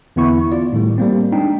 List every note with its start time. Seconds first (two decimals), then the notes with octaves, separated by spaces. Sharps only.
0.16 E2 D3 B3 E4 C#6
0.52 F4 D5
0.73 A2 D#3 G3
0.98 G3 A#3 C4
1.33 G#3 D4 D#4 G5